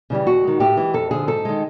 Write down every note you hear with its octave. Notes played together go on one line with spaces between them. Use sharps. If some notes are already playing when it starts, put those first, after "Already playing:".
C#3 E3 G3 G4
D#2 F#4
D#3 G#3
A2 G4
E3 G#3
F2 A4
D3 F3 G#4
G#2 A4
D#3 G#3